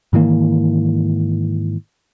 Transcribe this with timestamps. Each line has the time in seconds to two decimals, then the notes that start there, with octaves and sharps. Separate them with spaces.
0.13 G#2 D#3 E3 A#3